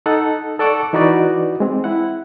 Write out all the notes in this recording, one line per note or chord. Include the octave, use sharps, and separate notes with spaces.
D#4 A4 F#5
A4 D5 F#5 C#6 D6 E6
E3 D#4 F#4 B4 D5
G#3 C4
E4 F#5